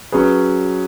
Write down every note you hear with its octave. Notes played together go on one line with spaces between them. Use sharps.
F#3 C#4 G#4 B4